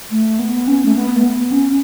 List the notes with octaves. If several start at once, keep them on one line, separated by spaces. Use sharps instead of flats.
A3
B3
C#4
A3
B3
A3
B3
C#4